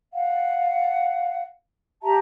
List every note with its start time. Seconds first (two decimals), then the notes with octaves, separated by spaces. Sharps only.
0.12 F5 F#5
2.01 G4 E5 A5 A#5